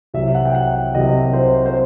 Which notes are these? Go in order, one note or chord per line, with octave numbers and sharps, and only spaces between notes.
C2 C3 F#3 E5
F#5
G5
F#5
C2 C3 F#3 D#5
C5
C5